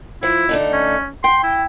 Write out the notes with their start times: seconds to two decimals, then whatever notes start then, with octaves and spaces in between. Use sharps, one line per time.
0.23 F3 E4
0.49 D3 A3 D#4
0.73 C#4
1.24 G5 C6
1.43 E4